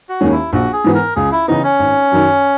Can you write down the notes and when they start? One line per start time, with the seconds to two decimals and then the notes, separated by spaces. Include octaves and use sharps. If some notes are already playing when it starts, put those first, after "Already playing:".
0.09 F#4
0.21 D#2 D#3 G#3 C#4
0.32 E4
0.52 A#1 F#4
0.73 G#4
0.84 G#2 E3 B3
0.95 A#4
1.16 C#2 G#4
1.32 E4
1.48 C#3 E3 B3 D#4
1.64 C#4
1.79 G#1
2.12 F#2 D#3